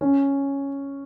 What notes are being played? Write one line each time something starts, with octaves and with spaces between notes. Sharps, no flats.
C#4